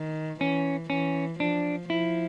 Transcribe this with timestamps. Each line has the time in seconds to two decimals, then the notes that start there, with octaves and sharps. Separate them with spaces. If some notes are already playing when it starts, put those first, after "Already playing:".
Already playing: D#3
0.41 E3 C#4
0.90 E3 C#4
1.40 F3 D4
1.90 F3 E4